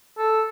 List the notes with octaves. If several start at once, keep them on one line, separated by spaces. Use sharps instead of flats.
A4